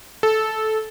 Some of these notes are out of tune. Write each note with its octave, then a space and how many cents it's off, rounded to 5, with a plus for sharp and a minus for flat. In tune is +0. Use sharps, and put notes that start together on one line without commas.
A4 -15